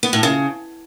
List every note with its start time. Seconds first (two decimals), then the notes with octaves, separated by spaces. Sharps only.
0.03 B3
0.13 A2
0.23 C#3